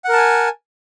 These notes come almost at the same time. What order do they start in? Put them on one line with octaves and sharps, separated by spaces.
F#5 A#4 A5 G#5